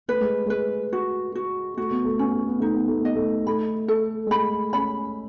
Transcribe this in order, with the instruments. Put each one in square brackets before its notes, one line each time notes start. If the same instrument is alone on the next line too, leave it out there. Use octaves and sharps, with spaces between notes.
[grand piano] A3 [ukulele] B4
[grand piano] G#3
[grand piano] G#3 [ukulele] B4
[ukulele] F#4
F#4
[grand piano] A3 [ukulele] F#4
[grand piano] B3
A3
[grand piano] B3 [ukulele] C#4
[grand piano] A3
B3
[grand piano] A3 [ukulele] D#4
[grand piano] B3
A3
[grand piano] B3 [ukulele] D#5
[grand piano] A3
[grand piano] A3 [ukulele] B5
[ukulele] A4
[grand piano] G#3
[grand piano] A3 [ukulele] B5
[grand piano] C#4 [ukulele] B5